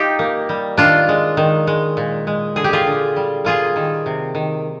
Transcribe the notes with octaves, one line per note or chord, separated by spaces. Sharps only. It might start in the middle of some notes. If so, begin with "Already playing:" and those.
Already playing: D#4 F4 G4
A#3
G3
D#3 D4 F4
G#3
D#3
G#3
A#2
G#3
D3 G#4
G4
F4 G#4
D3
G3
A#3 F4 G#4
D#3
C3
D#3